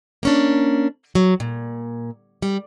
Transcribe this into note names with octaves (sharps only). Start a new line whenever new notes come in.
A#3 C#4 D4
F#3
A#2
G3